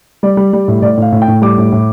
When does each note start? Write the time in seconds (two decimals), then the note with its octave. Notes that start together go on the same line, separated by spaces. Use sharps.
0.23 G3 D5
0.37 G3
0.53 G3
0.68 A2
0.82 A2 D5
0.97 A2 F5
1.12 A2
1.22 G5
1.28 A2
1.42 G3 D6
1.58 A2
1.72 A2